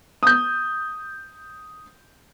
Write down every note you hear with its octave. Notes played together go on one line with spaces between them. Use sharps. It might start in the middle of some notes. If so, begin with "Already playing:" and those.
D#6 G6